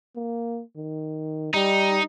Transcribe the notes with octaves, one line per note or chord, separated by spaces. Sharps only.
A#3
D#3
G3 D#4